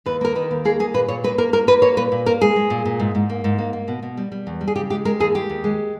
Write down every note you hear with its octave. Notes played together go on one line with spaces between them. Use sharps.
D#2 B4
A#3 A#4
D#3 B4
D#2
A#3 G#4
A#3 G#4
A#2 B4
A#2 C#5
A#3 B4
A#3 A#4
A#3 A#4
A#3 B4
A#3 C#5
A#2 B4
A#2
A#3 A#4
G#3 G#4
G#3
A#2
A#2
G#2
G#2
A#3
G#2
A#3
A#3
B2
B2
G3
G3
E2
G3
G#4
C#3 G4
G#3 G4
G#3 A#4
D#2 G#4
D#2 G4
D#2
G#3